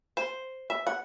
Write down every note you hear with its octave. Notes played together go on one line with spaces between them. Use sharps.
C5
E5
F#5